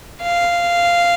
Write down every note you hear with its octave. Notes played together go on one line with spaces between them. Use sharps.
F5